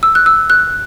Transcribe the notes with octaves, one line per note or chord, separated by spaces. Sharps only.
E6
F#6
E6
F#6